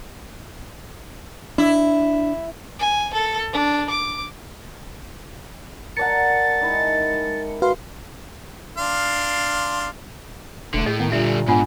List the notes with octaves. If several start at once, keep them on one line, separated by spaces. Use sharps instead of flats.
D4 E4
G#5
A4
D4
D6
A#4 D5 F#5 A5 A6 C#7
D#3 G#3 E4
F#4 B4 F5 C6
D4 F5 C6
E1 D3 A3
A2 G#4 D#5
D#3 B3
A#2 D3 G3 F4 E5
G#2 B3 D4 F4 F#5